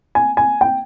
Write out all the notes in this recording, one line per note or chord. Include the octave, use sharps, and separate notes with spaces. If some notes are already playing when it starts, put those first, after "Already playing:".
G#5
G#5
G5